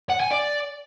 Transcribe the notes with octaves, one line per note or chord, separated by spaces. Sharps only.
F#5
G#5
D5